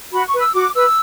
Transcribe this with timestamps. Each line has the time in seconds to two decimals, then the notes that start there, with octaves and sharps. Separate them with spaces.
0.12 F#4 B5
0.26 C#6
0.33 B4
0.40 E6
0.54 F#4 D6
0.75 B4 E6